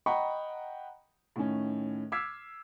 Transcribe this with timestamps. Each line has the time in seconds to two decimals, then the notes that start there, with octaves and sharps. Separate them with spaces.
0.06 D#5 F#5 G5 A#5 B5 C#6
1.36 A2 D#3 C#4
2.12 D6 E6 F6 G#6 B6 C7